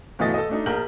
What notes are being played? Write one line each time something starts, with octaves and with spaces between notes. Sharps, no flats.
G1 B2 E3 A3 D#5 A6
A4 D#5
A3 D4 D#4
A#1 A#4 G6 F#7